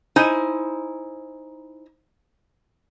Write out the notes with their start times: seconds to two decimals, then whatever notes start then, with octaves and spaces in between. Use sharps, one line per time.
0.16 D#4 E4 C5 G#5